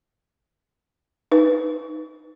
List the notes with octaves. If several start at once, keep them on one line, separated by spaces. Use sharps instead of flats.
D#4 B4